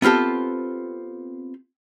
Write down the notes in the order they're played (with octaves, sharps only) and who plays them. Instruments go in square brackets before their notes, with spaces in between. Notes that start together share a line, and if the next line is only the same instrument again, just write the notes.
[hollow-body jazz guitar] B3 C4 F4 G4 A4